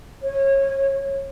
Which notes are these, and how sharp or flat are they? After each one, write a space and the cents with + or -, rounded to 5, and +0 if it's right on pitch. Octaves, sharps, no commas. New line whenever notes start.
C#5 -25